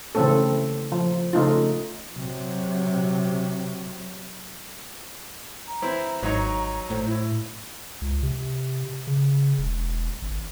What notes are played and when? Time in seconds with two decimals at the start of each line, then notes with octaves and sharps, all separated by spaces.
0.15 C#3 E3 A3 C4 C#4 A4
0.92 F3
1.33 C#3 A3 D#4 F4
2.13 C3 F#3
5.67 A#5
5.82 E3 C4 E4
6.23 G#1 F#3 D#4 C#5
6.90 A2 C5
7.06 E4
8.01 C#2
8.23 C3
9.07 C#3
9.58 E1
10.22 G#1